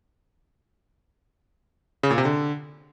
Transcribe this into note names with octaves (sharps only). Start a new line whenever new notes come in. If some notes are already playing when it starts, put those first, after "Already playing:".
C#3
A#2
C3
D3